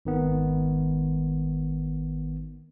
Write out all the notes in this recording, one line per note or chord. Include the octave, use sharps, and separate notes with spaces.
G#1 D#3 B3